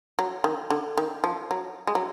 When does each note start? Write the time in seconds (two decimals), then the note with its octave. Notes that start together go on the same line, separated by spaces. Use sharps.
0.19 F#3
0.44 D#3
0.70 D3
0.97 D#3
1.24 F3
1.51 F#3
1.87 G#3
1.95 F#3